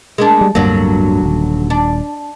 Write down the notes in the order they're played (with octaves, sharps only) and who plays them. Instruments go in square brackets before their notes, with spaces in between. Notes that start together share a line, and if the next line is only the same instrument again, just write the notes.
[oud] G#3 A#3 D4
[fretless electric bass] G3
[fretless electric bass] D1 G2 A#3 [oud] D3 F#3
[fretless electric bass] D#1
[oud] D4